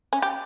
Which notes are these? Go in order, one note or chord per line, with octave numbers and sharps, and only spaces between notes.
C#4
G4